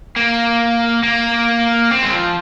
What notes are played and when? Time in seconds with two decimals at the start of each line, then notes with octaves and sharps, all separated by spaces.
0.17 A#3
1.03 A#3
1.91 C4
2.03 G#3
2.12 F3